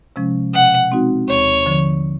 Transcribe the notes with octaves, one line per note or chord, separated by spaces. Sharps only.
C3 F3 G#3 C#4
B2 F#5
G#3 C4 D#4 F#4
D#2 C#5
D3 F3